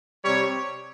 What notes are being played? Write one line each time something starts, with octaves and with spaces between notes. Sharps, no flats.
C3 G3 C#5